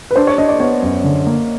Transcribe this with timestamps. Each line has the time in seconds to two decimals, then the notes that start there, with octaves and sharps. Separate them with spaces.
0.11 B4
0.16 D4 C5
0.27 C#5
0.38 D4 D#5
0.49 D5
0.60 B3 C#5
0.82 F#2
1.04 D3
1.27 A#3